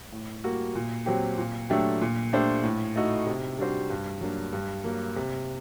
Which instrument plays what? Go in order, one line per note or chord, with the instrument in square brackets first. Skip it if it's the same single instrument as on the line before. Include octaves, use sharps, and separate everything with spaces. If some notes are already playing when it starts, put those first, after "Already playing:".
[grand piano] A2
G3 A#3 F#4
A#2
F#3 C4 G4
A#2
F#3 A3 D4 G4
A#2
A3 D4 G4 C5
A2
A3 D#4 F#4
C3
G3 D4 F#4 C5
G2
F#3 A#3 D4
G2
F#3 A#3
C3